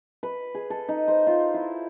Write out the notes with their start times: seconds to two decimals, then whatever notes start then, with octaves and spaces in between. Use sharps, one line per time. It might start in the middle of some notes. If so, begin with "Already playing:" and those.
0.23 B4
0.55 G#4
0.70 A4
0.89 D#4
1.08 C5
1.27 F4
1.54 E4